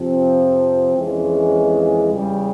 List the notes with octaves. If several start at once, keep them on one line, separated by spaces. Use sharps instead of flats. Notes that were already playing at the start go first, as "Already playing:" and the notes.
Already playing: F2 C3 F3 C4
F2 E3 G#3 C#4
E2 C#3 G3